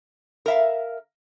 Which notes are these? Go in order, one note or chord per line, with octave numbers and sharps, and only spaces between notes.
A#4 E5 F5